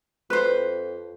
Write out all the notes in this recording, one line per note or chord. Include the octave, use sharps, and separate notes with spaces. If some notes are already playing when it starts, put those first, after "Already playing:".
F2 B4 C5